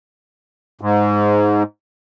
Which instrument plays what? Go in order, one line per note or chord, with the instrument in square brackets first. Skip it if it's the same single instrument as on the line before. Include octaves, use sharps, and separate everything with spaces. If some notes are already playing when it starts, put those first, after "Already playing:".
[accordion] G#2